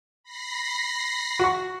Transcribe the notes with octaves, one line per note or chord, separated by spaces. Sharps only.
B5 A#6 C7
F#4 C#6